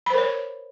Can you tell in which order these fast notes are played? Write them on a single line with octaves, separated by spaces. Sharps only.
B5 C5 A#4 C#5